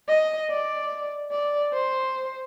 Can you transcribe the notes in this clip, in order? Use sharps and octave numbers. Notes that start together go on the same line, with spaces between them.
D#5
D5
D5
C5